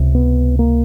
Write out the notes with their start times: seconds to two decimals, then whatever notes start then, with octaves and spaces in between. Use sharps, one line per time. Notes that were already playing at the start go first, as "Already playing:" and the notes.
Already playing: C#2 C3
0.15 B3
0.59 A#3